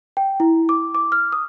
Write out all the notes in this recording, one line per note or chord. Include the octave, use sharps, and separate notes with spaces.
G5
E4
D6
D6
F6
D#6